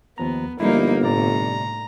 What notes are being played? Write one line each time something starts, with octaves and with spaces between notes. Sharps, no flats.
D#2 F3 B3 A#5
G1 F3 G3 G#3 A#3 D#4 E4
A2 C3 D5 A#5